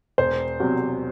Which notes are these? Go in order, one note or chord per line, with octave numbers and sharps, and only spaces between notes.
E1 C5
E2 C3 F#3